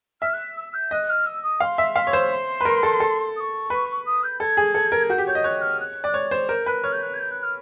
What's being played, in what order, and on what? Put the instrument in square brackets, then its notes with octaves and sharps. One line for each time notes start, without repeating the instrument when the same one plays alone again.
[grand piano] E5 [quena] F6
[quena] F#6
E6
G6
[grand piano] D#5 [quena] F#6
[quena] F6
E6
D#6
[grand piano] F5 [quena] C6
[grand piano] E5
F5
C#5
C5
[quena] C6
[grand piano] B4
A#4
A4
A4
[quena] D#6
C#6
[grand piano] B4
[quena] D#6
G6
[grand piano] A4 [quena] G#6
[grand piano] G#4
A4
A#4
[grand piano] F#4 [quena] G6
[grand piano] G4
[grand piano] C#5 [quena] G6
[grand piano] D#5
[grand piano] C#5 [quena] F#6
[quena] F6
F#6
[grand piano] D5
C#5
C5
[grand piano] A#4 [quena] G6
[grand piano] B4 [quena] F#6
[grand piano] C#5 [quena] F6
[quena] G6
F#6
G#6
G6
F#6
F6